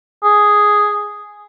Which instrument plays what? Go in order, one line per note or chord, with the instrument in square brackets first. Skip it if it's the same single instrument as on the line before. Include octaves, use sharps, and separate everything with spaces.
[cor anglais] G#4